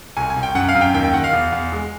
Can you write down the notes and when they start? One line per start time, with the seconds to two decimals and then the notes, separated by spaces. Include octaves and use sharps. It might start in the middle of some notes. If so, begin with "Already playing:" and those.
0.17 C2 G#5
0.30 G#5
0.36 C2
0.43 G5
0.55 F#2 F#5
0.68 F5
0.75 F#2
0.81 G5
0.94 D#2 G5
1.04 G5
1.13 D#3 F#5
1.24 F5
1.33 E2
1.52 E2
1.72 G#3